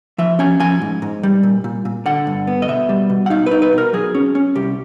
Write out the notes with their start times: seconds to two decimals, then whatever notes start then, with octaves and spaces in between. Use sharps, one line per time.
0.18 F3 E5
0.39 C#4 G#5
0.60 F3 G#5
0.81 G#2
1.02 G#2
1.23 G3
1.43 A#2
1.64 A#2
1.85 A#2
2.06 D3 F#5
2.27 G2
2.47 B3
2.62 D#5
2.68 B2 E5
2.89 G3
3.10 B2
3.26 F#5
3.30 D#4 F5
3.46 B4
3.51 D#4
3.62 B4
3.73 B2
3.78 A#4
3.93 F#3 G#4
4.15 C#4
4.35 C#4
4.55 C2 G4